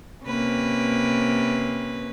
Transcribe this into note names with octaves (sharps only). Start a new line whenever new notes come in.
C3 A#3 C#4 B4